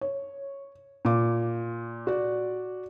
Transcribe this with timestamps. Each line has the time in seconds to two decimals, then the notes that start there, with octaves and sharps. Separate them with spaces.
0.01 C#5
1.05 A#2 D6
2.07 F#4 D5